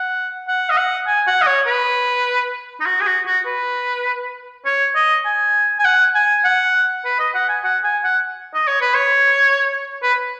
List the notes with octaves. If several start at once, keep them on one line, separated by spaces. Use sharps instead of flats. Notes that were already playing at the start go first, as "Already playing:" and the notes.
Already playing: F#5
F#5
D#5
F#5
G#5
F#5
D#5
C#5
B4
D#4
F#4
G#4
F#4
F#4
B4
C#5
D#5
G#5
G#5
F#5
G#5
F#5
B4
D#5
F#5
G#5
F#5
G#5
F#5
D#5
C#5
B4
C#5
B4